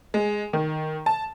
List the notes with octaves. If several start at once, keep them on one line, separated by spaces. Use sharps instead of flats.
G#3
D#3
A5